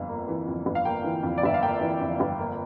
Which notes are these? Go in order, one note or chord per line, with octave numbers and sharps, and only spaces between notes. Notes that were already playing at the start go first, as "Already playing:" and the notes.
Already playing: G1 F2 F5
A#3
E3
F2
G1
F5
A#3 G5
E3
F2
D5
G1 E5
F5
A#3 G5
E3
F2
G1
A#3